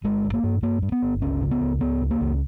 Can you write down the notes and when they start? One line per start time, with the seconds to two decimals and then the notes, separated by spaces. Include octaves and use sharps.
0.04 G1 G#3
0.24 G2
0.34 A#3
0.44 G2
0.62 G2 A#3
0.82 G2
0.92 B3
1.02 G1
1.22 C#2 C#4
1.42 C#3
1.51 B3
1.61 C#2
1.81 C#2 B3
2.01 C#3
2.11 A#3
2.21 C#2